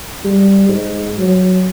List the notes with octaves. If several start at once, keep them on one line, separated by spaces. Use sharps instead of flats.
G3
G#2
F#3